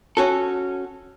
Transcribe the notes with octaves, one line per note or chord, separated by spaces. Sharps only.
C#4 F#4 A4